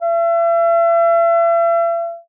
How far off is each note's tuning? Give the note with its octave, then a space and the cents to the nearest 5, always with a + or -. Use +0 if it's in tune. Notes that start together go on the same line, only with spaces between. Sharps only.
E5 +40